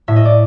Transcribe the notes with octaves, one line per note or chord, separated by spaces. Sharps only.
A2 E5
D#5
D5